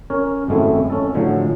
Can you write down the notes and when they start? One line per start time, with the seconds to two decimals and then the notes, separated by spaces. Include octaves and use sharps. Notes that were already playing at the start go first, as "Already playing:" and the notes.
0.10 C#4 A#4 C#5
0.48 G#1 F#2 G#3 A3 C4 E4
0.90 C#4 A4
1.14 A2 D3 F3 F#3 G#3